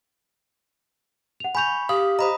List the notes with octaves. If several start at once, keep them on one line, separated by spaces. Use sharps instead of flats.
F#5 F7
G#5 B5 C#6 G6 F7
G4 F5 D#6
C5 D#5 A#5 B5 D#6